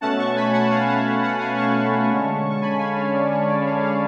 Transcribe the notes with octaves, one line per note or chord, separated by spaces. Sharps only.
B2 A3 C#4 F#5 A5
A5 C#6
G#5 B5
F#5 A5
F5 G#5
F#5 A5
F#5 A5
F5 G#5
A5 C#6
D3 G#3 C#4
C#6
G#5 B5
F5 G#5
C#5 F5
D5
C#5
D5
C#5 F5
C#5 F5